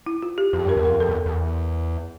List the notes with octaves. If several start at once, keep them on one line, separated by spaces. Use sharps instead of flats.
E4
F4
G4
F2 G4
G2 A#4
E2
F2 A#4
F2 A4
E2
E2